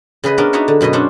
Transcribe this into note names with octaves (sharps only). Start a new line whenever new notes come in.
C#3 G#4 B4 D#5
B3 C#4 D4 A#4
D4 D#4 F#4 C#5 E5
D3
F#2 B2 B4 D#5
C#4 D4 C5 F#5